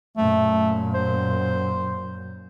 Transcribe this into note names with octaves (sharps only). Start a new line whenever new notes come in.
F#2 A#2 A3
C5